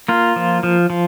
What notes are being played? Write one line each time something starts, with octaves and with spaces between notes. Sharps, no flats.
A#3 F4
F3
F3
F3